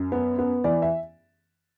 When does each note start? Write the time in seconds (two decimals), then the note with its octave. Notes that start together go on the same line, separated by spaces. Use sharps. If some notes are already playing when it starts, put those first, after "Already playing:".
Already playing: F#2
0.12 B3
0.39 B3
0.64 E3 D5
0.82 E5